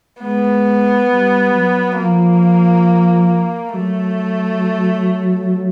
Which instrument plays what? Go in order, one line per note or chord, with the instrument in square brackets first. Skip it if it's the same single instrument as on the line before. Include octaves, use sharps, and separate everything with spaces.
[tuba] G#3 [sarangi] B3
[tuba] G3
F#3
[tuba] F3 [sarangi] A#3
[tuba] F#3 [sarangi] A3